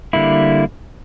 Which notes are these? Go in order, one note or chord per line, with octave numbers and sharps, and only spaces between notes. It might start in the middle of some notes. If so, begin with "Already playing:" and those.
D3 G3 A#3 E4